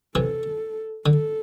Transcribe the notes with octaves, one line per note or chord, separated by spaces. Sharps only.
C3 E3 A4
D3 A4